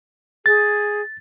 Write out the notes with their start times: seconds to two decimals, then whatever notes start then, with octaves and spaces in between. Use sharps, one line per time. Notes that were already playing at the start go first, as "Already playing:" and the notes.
0.46 G#4 A6